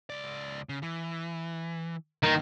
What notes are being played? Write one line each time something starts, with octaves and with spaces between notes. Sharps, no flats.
C#2 D5
C#3
E3
G2 D#3 A#3